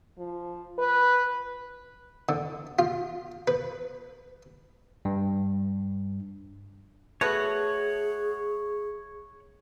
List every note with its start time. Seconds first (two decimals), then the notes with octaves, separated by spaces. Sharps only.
0.18 F3
0.78 B4
2.29 D3
2.79 F4
3.48 B4
5.05 G2
7.21 A3 B3 F#4 G#4 C#5 F#5